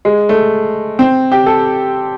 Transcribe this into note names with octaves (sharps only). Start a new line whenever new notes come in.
G#3
A3
C4
G4
A4